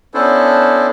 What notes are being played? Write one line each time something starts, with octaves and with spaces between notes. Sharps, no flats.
B3 C#4 D4 E4 A4 C5